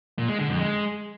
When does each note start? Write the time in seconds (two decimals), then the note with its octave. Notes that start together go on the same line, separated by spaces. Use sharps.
0.18 A#2
0.29 G#3
0.39 D3
0.49 F2
0.59 G#3